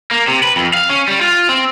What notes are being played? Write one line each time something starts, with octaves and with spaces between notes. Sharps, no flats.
A#3
C3
B4
F2
F5
C#4
G3
F4
C4